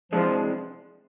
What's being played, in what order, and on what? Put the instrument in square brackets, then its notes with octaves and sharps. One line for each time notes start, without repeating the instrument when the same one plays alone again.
[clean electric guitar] C3 E3 G#3 D4 [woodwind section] F3